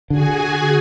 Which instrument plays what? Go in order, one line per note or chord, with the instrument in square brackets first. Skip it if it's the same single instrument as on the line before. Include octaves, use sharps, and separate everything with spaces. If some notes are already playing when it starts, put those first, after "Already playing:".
[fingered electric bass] D3 [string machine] F#4 G#4 G#5